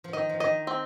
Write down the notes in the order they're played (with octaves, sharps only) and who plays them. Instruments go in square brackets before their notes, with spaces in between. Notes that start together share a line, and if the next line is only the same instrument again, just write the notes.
[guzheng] F3
[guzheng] D#3 [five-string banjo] D#5
[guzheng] F3
[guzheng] D#3 [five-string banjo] D#5
[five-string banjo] C4